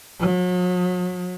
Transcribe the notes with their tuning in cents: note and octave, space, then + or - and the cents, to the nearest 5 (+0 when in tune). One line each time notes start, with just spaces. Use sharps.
F#3 -40